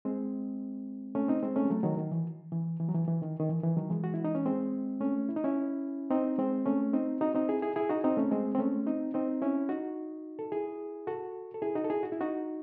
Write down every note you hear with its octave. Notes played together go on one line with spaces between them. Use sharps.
G#3 C4
A3 C#4
C4 D#4
G#3 C4
A3 C#4
G#3
F#3 A3
D#3 F#3
D#3
E3
E3
E3
F#3
E3
E3
D#3
D#3
E3
E3
D#3 F#3
E3 G#3
F#4
E4
D#4
C#4
G#3 C4
A3 C#4
E4
D#4
C#4 E4
C4 D#4
G#3 C4
A3 C#4
C4 D#4
D#4 F#4
C4 D#4
E4 G#4
E4 G#4
E4 G#4
D#4 F#4
C4 D#4
A3 C#4
G#3 C4
C4
A3 C#4
C4 D#4
C4 D#4
C#4 E4
D#4 F#4
A4
E4 G#4
F#4 A4
A4
E4 G#4
D#4 F#4
A4
E4 G#4
F#4
E4
D#4 F#4